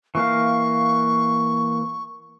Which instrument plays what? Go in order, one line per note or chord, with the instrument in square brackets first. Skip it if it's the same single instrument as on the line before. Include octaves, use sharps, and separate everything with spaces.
[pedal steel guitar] E3 A#3 F5 [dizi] C#6